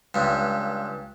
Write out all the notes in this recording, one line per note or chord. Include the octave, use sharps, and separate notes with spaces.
C#2 G2